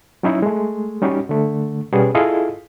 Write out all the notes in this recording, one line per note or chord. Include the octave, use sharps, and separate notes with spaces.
F#3 C#4 D#4 E4
G#3 A3
G3 C#4 D#4 F#4 G4
D3 A3
B2 G3 B3 C#4 G4 G#4
E4 F4 G#4 A4 D#5 F5